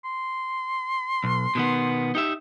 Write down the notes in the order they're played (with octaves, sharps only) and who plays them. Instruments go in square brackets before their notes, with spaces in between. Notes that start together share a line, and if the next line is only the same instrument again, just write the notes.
[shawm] C6
[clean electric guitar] B1
B2 D#3 B3
D#4 G4 E5